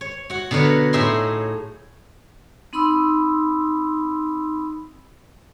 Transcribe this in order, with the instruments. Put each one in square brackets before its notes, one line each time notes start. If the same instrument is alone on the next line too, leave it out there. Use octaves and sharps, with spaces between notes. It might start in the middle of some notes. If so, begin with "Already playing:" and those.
[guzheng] C#5
F#4 F#5
B2 D3 A#4 B4 C#5
A2 F#3 D#4 G#4 E5 C6
[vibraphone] C4 D#4 B5 C6 D#6 E6